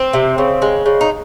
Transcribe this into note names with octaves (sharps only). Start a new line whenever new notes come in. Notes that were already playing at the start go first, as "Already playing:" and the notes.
Already playing: C4
C3
C#3
G#3
C#3
D#4